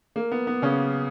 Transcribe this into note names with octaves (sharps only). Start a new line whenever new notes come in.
A#3
B3
B3
C#3 C#4